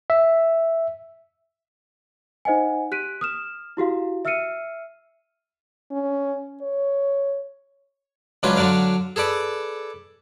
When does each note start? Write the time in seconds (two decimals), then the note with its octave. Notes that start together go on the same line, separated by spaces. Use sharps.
0.10 E5
2.45 D#4 C5 D#5 F#5 G#5
2.91 G4 F#6 B6 D7 D#7
3.21 D#6 F6 E7
3.77 E4 F#4 G4 F5
4.25 E5 E6 F6 C7 C#7 D#7
5.91 C#4
6.62 C#5
8.43 C#2 F#3 C#4 D4 F4 B4
8.56 D3 F#3 D4 D5 F5
9.16 G#4 A4 B4 D5